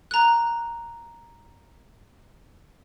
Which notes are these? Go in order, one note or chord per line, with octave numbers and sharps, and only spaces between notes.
A#5 F#6